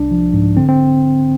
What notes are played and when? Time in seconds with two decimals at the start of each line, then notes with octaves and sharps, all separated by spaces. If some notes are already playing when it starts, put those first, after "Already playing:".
Already playing: C2 D4
0.11 F3
0.33 G#2
0.57 D3 C4
0.69 C4